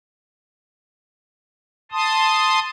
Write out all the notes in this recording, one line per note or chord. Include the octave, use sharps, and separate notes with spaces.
A5 C6 D#6